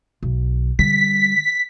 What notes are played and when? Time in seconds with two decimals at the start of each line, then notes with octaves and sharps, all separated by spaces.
0.23 B1
0.79 D3 G3 B6